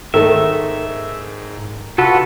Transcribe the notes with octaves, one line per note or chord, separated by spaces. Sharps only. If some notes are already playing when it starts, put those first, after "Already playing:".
G#2 D#3 A3 E5
C3 F4 F#4 A4 B4